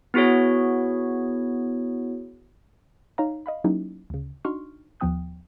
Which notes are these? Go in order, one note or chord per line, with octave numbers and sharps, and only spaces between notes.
B3 E4 F#4 G#4 C#5
D#4 C#5 F5 A#5
D#5 F5 B5
F#3 A#3 C#4 D#4 E4 G4
D2 C#3
D4 D#4 F#4 C6 C#6 F6
D#2 F3 B3 G5 D#6 F#6